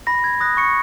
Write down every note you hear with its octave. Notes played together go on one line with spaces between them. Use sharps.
B5 A#6
G#6
D#6 F#6 A#6
C#6 C#7